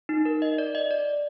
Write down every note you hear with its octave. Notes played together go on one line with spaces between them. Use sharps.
D#4
A#4
D#5
D5
D#5
D5